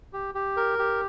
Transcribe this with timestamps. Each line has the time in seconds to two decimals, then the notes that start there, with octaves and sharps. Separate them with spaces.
0.13 G4
0.35 G4
0.57 A#4
0.79 G4